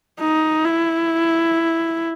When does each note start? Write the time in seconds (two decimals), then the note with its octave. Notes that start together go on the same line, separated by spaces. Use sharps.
0.20 D#4
0.64 E4